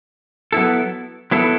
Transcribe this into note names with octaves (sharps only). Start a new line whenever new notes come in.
F#3 B3 E4 A4
F#3 B3 E4 A4